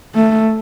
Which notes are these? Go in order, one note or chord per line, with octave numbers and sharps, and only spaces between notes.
A3